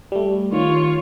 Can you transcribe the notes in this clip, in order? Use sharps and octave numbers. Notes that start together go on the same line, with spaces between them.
G3 A3
D#3 F4 C#5